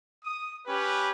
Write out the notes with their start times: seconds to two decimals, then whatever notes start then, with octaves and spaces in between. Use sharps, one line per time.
0.25 D#6
0.67 C#4 G4 B4